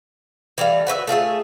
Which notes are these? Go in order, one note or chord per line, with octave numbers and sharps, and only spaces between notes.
E3 G3 A3 F5
F#4 B4 C#5 E5
A3 F4 G#4 E5